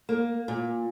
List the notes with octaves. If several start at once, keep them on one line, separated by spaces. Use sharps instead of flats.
A#3
A#2